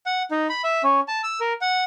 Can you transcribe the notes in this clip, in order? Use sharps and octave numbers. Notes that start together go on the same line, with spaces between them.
F#5
D#4
B5
E5
C#4
A5
E6
A#4
F#5